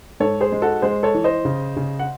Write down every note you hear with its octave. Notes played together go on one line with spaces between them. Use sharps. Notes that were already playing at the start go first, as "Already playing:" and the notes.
G#2 A4 C#5
G#4 C5
G#3
F#4 A4
G#3 G#4 C5
A4 C#5
E3
C5 D#5
C#3
C#3
F#5